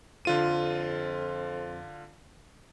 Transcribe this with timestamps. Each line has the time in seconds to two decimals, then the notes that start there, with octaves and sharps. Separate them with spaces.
0.25 F2 D3 F4 D#7